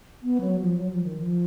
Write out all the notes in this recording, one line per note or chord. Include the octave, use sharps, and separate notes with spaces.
B3
F#3
F3
F#3
F3
D#3
F3